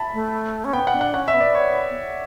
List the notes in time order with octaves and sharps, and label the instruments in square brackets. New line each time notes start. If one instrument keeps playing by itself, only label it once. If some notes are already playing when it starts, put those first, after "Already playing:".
Already playing: [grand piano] E5 A5 B5
[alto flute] A3
C#4
[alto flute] B3 [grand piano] G5
[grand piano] F#5
[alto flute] D4
[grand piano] F#5
[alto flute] C#4 [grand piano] F#5
[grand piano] E5
[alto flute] B3
[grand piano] D5
C#5